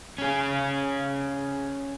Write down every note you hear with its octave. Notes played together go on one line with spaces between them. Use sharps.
C#4 G#4